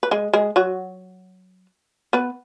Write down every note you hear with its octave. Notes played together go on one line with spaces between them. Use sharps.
B4
G#3 G#4
G#3 G#4
F#3 F#4
B3 B4